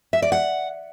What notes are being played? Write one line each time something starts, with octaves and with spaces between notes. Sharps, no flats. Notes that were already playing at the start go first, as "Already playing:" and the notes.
E5
D5
F#5